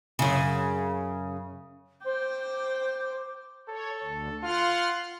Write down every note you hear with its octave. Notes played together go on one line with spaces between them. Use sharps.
F#2 C#3
C5 G5 D6
A4 C#5
D2 D3
F4 F#5 C6 F6